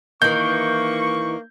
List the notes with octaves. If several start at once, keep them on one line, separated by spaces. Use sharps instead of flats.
D#3 E3 A#3 C#6 G6